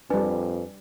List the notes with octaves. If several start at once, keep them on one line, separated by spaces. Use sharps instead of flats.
F2 G3 D4 B4 G#5